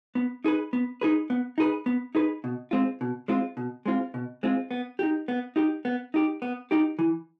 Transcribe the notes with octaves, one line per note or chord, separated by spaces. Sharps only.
B3
D#4 G#4 B4
B3
D#4 G#4 B4
B3
D#4 G#4 B4
B3
D#4 G#4 B4
B2
G#3 C4 F4
B2
G#3 C4 F4
B2
G#3 C4 F4
B2
G#3 C4 F4
B3
D#4 G4
B3
D#4 G4
B3
D#4 G4
B3
D#4 G4
E3